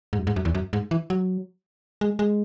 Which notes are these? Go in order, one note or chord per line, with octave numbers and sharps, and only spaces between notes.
G#2
F#2
G#2
F#2
E2
F#2
G#2
E3
F#3
G#3
G#3